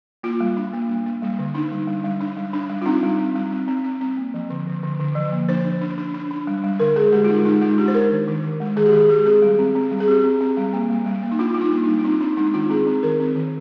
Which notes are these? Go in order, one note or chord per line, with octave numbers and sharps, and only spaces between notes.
A#3 F4
G3
D4
A#3
G3
A#3
G3
D3
D4 D#4
G3
G3
G3
D4
G3
D4
G3
F4
C4 D#4
G3
C4
G3
C4
C4
C4
C4
A#3
F3
D3
D3
D3
D3
F3
A#3
D4 C5
D4
D4
D4
D4
D4
G3
G3
D3 A#4
G#3 G#4
G#3 G4
F4
G#3 D#4
G#3 D#4
G#3 F4
D4 G4
C5
G#3 A#4
D#3
D#3
D#3
G#3
D#3 G#4
G4
D#3 G#4
G#3 G4
C4 G#4
G3
C4
C4
G3
G#4
C4 G4
C4
C4
G3
A#3
G3
G3
A#3
D#4
D4 F4
G3 F4
D#4
A#3
D#4
G3
F4
C4 D#4
C4 D4
G#3 D#4
D#3 F4
C4 G#4
C4
D#3 A#4
C4
D#3